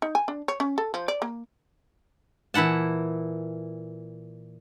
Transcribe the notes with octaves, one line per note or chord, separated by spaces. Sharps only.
D#4
G#5
D4
C#5
C#4
A4
F3
D5
A#3
A#2 E3 E4 F#5 A5